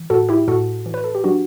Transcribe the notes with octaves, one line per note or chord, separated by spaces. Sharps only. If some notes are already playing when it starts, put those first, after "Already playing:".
Already playing: E3
A2 F#4 A4
E4 G4
A2 F#4 A4
E3
B4
A4
G4
F#3 D4 F#4